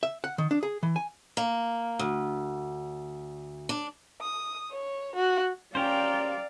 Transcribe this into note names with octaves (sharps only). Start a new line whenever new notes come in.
E5
F#5
D#3
D4
G#4
E3
G#5
A#3
D2
D4
D#6
C#5
F#4
C#4 G4 A#4 C5 D5 F5 G5 A#5